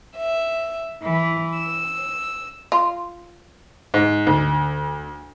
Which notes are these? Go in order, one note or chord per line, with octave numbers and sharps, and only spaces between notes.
E5
E3
E6
F4
G#2
D2